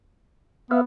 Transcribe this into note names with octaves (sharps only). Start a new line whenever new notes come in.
B3 B4 E5 F5